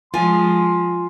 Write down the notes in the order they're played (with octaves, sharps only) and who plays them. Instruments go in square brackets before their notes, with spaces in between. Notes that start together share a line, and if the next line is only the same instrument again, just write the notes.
[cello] F3 G#3 [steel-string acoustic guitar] F4 G#5 [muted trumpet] C6